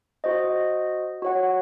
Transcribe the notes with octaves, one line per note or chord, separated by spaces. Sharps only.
F#4 C5 D#5
F#4 C#5 F#5